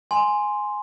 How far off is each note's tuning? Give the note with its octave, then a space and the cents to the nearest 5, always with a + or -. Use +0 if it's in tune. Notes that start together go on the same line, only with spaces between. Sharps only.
G#5 +0 C6 +0